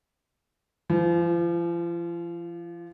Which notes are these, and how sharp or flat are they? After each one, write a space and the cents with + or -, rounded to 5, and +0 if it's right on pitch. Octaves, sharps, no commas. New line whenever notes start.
F3 -40 F4 +0